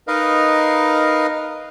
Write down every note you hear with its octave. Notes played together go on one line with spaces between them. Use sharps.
D#4 A#4 B4 D#5 F5